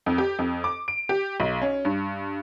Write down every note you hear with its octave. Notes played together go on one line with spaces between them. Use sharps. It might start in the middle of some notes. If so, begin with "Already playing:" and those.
F2
G4
F2
D6
D7
G4
B1
C#4
G2